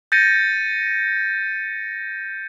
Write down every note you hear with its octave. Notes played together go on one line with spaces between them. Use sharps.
G6 A6 A#6 C#7 D#7